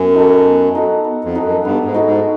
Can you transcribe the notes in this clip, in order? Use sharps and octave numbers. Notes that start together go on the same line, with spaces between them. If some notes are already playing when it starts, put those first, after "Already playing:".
Already playing: F#2 B3
D#4 F#4 A4
B3
D#4 F#4 A4
B3
F2
D#4 F#4 A4
F#2
G2 B3
G#2
D#4 F#4 A4
G#2